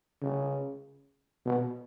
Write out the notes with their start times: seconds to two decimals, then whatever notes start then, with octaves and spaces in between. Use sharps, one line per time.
0.22 C#3
1.46 B2